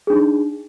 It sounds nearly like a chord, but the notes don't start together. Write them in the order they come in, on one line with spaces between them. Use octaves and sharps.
G#4 D4 D#4